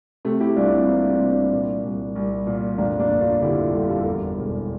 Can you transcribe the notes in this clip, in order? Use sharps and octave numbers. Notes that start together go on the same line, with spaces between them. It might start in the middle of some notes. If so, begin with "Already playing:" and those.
C3 A3
E4 G4
C2 D4 F4
C4 E4
E3 A#3 D4
C4 E4
C2
A#3 D4
A#2
C2
C2
A#2
F2 A#3 D4
A#3 D4
G1
D4 F4
D3 E4 G4
F4 A4
G1 F4 A4
G4
F4 A4
A4
E2 G4 A#4
E1